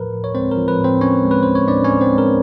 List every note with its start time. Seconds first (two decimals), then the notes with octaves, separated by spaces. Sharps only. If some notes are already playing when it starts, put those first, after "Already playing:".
Already playing: A2 F3 A#4 B4
0.13 A2
0.24 C#5
0.35 G#3 C4 C5
0.51 A#4
0.57 F3
0.68 B4
0.79 A2
0.84 C4 C5
1.01 A2 C#4 C#5
1.23 G#3
1.31 B4
1.43 F3 C5
1.55 C#5
1.67 A2 D4 D5
1.84 C#4 C#5
1.90 A2
2.01 C4 C5
2.12 G#3
2.18 A#4